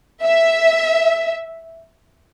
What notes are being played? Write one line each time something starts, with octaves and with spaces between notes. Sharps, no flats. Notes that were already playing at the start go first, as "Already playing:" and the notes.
E5